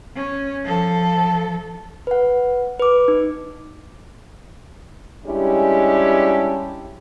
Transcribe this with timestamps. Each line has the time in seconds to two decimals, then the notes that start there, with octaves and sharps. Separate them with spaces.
0.16 C#4
0.64 F3 A4
2.07 B4 F#5
2.80 B4 D6
3.08 D#4
5.27 G3 G#3 C#4 D4 E4 G4